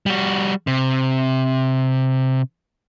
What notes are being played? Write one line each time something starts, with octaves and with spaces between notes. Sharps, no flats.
G3 F#4
C3